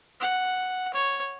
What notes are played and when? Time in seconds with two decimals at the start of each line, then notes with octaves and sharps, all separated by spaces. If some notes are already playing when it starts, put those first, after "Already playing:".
0.21 F#5
0.94 C#5